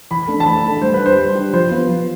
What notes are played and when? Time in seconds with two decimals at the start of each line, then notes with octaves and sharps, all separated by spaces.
0.11 E3 B5
0.28 A3 D4 A4
0.40 A5
0.46 E3 B5
0.64 A3 D4 A4
0.82 G3 C5
0.94 B4
0.99 D4 G4
1.06 C5
1.17 G3
1.35 D4 G4
1.54 F3 C5
1.71 B3 F4 B4
1.89 F3